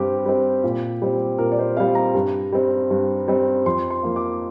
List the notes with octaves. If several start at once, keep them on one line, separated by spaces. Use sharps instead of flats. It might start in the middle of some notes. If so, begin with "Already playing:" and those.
Already playing: G2 G3 C4 G4
G3 C4
A#2
G3 C4
A#2 A#4
D5
C5
G3 C4 F5
A#5
G2
G3 C4
G2
G3 C4
F2 C6
C6
F3 A#3
D6